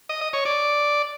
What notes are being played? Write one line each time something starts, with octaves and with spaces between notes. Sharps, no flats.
D#5
D#5
C#5
D5